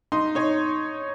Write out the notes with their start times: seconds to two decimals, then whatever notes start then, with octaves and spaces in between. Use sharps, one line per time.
0.12 D#4 C6
0.35 D#4 C#5